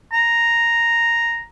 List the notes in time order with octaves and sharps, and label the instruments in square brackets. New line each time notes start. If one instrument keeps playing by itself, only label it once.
[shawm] A#5